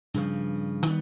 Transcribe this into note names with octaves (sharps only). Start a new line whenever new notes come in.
G2 C#3 F3
D#3 G3 B3